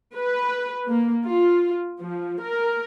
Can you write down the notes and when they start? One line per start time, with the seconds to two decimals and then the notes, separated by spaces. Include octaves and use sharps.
0.16 B4
0.89 A#3
1.26 F4
2.01 F3
2.41 A#4